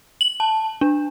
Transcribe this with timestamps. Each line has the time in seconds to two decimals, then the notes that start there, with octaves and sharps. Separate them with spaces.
0.21 F#7
0.40 A5
0.81 D4